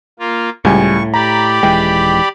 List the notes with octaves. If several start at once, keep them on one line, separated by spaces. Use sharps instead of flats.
A#3 F4
C#2 A2 G3 G#5 C#6
G4 D5 A#5 B5
D#1 E3 G#3 G5